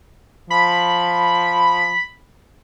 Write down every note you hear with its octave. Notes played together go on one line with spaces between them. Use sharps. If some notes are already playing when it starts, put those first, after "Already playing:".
F3 B5